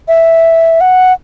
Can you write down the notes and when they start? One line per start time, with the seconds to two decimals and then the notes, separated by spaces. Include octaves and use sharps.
0.08 E5
0.81 F#5